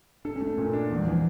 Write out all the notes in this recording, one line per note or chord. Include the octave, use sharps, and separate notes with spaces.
D4 A4
C#4
A3
D4
A#2 C#4
D4
E2 A#3
G3
E3 F3